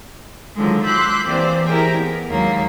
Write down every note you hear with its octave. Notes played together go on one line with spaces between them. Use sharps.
D3 D#3 F3 F#3 G#3
B5 C6 D6 E6 F#6 G6
E3 A#3 C4 G4 C5 D5
E4 G4 G#4 A#4 G5 G#5
B3
D#2 F3 F#3 G#3 A#3